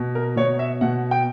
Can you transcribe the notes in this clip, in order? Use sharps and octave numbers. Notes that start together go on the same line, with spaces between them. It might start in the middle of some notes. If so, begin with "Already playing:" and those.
Already playing: B2
A#4
B2 C#5
E5
B2 F#5
G5